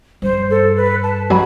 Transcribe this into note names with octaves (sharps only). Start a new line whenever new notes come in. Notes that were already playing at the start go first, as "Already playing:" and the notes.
G2 C5
A4
B4
A5
F#3 B5